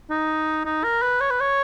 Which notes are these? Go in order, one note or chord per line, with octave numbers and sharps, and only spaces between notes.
D#4
D#4
A#4
B4
C#5
B4
C#5